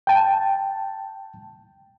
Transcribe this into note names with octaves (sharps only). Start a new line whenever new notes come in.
G5 A5